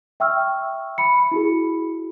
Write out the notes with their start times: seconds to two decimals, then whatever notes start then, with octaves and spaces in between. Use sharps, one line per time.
0.20 E5 G5 C#6 E6 F6
0.98 B5 C#7
1.32 E4 F#4 G#4